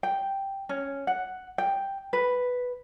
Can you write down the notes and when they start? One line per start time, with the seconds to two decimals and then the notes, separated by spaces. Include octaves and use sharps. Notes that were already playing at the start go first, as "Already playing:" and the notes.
0.03 G5
0.69 C#4
1.07 F#5
1.58 G5
2.13 B4